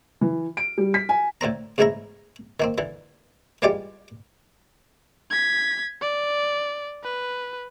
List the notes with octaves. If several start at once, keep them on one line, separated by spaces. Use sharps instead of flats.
E3
D7
G3
B6
G#5
A2 D3 C4 A#5
E2 G#2 C#3 A3 E4 A#5
D#3 A#3 C4
D3 E3
E3 G3 G#3 F4 G4 D5
G#6 B6
D5
B4